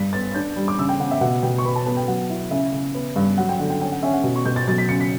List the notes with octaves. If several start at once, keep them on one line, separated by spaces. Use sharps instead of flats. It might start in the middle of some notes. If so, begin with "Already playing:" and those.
Already playing: G2 B6
B3 A6
D4 G6
G3
D6
C#3 E6
G5
C#3 F#5
E5
B2 F#5
B2 G5
C#6
B3 B5
A5
B3 A5
G5
F#3 F#5
E4
C#3 E5
C#3
B3
G2
F#3 F#5
G5
D3 F#5
G5
C#4 G5
F#5
C#4 E5
F#5
B2
C#6
B2 G6
A6
F#3 A6
B6
C#3 C#7
B6